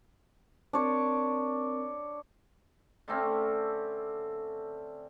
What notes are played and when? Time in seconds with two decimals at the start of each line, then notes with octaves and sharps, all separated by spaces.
0.73 C4 D4 A#4 C#5
3.08 D3 A3 C4 C#4